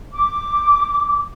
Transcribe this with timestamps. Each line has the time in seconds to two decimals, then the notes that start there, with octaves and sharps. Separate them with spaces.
0.12 D6